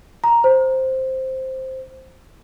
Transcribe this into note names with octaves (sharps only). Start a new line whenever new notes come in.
A#5
C5